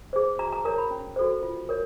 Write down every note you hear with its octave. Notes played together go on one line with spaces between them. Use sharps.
G#4 C5
F#4 A#5
A#5
A#4 C#5 A#5
B5
C#4
F#4 A4 C5
F4
A#4 C#5